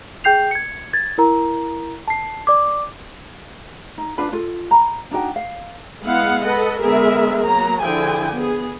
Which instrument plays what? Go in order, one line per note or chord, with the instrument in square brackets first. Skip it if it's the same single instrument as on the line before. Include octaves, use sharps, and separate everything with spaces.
[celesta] G#4 G5 G6 C7 F7
G#6 C#7
G#6 A6
E4 A#4 A#5
A5 C7
D5 D6
[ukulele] D#4
D4 F4 B4 B5
F4 A4
A#5 B5
D4 D#4 F#4 G5
F5
[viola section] G#3 B3 E4 F5 F#5
A4 B4 D#5 F#5
D3 G#3 B3 G#4 A#4 E5
F#3 A#3 B3 A#5
D3 F3 E4 G#4 G5 G#5
B3 G#4